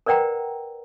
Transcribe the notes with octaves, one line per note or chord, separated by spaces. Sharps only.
A#4 B4 D5 F#5 G5 A#5